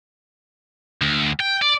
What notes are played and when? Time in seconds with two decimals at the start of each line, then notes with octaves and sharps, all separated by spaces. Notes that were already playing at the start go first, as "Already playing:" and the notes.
1.02 D2
1.40 G5
1.62 D5